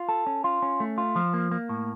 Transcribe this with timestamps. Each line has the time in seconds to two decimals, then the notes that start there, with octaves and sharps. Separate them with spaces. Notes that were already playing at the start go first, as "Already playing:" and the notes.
Already playing: F4
0.09 A4
0.27 C#4
0.44 F4
0.62 C#4
0.80 A3
0.98 F4
1.16 F3
1.34 A#3
1.52 A#3
1.69 A2